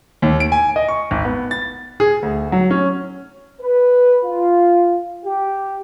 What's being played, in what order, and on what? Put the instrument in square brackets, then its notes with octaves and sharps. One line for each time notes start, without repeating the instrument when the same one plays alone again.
[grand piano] D#2
D7
G#5
D#5
C#6
G#1
B3
A6
G#4
D2
F#3
C#4
[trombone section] B4
F4
G4